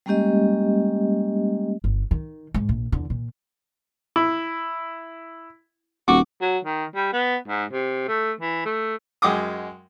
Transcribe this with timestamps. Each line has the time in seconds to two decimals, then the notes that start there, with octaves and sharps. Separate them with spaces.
0.06 G3 G#3 A#3 C#4 G4 D#5
1.84 G1
2.11 D#3
2.54 G#2
2.69 A#1
2.92 E2 D3
3.10 A#2
4.16 E4
6.08 D#1 F#4 D6
6.42 F#3
6.65 D#3
6.96 G3
7.13 B3
7.48 G#2
7.73 C3
8.08 A3
8.41 E3
8.66 A3
9.22 F#2 G#3 F#5 G5 D6 D#6